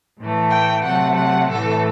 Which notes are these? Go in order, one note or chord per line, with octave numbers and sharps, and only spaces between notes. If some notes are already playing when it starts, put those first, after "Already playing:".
A2 E3 A3
G5
C3 F#3 A3 F#5
F#5
A2 E3 A3 A4